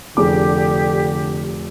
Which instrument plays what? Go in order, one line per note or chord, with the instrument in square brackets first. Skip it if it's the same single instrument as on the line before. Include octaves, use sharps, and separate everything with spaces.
[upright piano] F1 G#4 D6 [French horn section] D3 [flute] G4